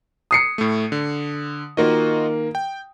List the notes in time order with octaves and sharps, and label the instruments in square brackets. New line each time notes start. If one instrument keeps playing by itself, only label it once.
[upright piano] D#6 C7 C#7
[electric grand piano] A2 A3
D3
[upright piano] D#3 A#3 [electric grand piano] F4 F#4 D#5
[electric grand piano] G5